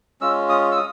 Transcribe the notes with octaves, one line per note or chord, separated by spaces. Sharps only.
G#3 C#4 F4 E6
D#6
E6
D#6